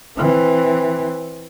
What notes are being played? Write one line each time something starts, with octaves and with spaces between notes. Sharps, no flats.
E3 C4